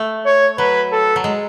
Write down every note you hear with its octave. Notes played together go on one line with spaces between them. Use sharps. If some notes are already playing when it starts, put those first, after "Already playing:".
Already playing: A3
C#5
F#3 B4
A4
F#3
G#3